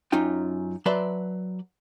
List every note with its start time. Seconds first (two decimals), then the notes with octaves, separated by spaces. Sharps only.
0.12 F#2 C#4 D#4 F4 G5
0.86 F#3 B4 D5 E5 A5 C6